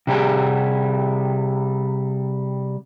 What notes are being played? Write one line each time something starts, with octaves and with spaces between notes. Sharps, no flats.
C3 G3 G4 G#4